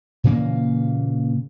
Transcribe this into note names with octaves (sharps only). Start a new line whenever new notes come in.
A#2 C#3 E3 A#3